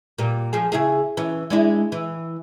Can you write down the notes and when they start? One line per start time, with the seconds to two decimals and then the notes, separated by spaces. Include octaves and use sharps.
0.18 A#2 G3
0.53 F3 G#4
0.72 C#3 E4 G#4
1.17 E3 C#4
1.50 G#3 D4 E4
1.92 E3